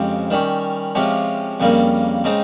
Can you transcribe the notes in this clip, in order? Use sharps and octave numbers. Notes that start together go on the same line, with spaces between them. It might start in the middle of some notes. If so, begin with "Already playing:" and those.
Already playing: F2 C#3 G#3 C4 G4
D#3 G3 C#4
C3 F3 G#3 C#4 G4
F2 C#3 G3 A#3
C#3 G#3 C4 D#4